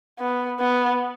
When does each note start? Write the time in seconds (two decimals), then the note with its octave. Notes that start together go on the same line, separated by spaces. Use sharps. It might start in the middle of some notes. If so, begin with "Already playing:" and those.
0.19 B3
0.60 B3